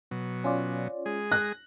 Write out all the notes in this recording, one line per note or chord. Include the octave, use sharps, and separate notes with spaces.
B2 F#3
C#4 F4 D5
G#3 G#4
F#6 A#6